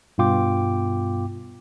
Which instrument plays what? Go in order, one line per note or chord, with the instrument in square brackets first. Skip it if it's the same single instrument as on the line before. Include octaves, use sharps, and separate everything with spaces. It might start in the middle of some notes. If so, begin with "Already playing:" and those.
[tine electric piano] G2 B2 B3 F4 G5 D6